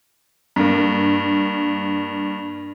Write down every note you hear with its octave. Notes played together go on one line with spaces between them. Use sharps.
G2 A#3